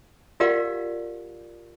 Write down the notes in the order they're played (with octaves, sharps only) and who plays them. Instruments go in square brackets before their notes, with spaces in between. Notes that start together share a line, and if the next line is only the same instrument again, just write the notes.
[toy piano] F4 G4 A#4 D5 F5 F#5